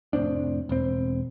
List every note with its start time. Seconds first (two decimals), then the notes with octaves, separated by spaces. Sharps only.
0.13 F1 A2 C4 D4
0.69 E1 C4